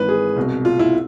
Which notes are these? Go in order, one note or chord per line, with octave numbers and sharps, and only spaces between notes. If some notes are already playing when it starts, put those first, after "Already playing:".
Already playing: G#1 G#2 E3 B4
G#4
C2 B2
F4
E4